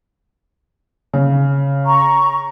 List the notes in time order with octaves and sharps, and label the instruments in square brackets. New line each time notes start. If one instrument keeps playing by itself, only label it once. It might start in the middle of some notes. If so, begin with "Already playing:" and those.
[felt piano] C#3
[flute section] A#5 C#6